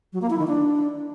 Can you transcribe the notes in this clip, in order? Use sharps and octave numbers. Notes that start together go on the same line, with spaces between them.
F#3
A#3
E4
D#3
D4